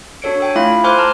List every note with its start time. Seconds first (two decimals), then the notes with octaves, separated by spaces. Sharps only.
0.22 D4 F#4 A4 C#5 C#7 D7
0.40 A4 G5 G#5
0.56 A3 E4 F4 F5 B5
0.84 C5 G#5 C6 D6 F6 F#6
0.98 A5 A#5 F6